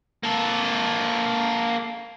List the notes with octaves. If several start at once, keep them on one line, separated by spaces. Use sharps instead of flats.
A#3 A4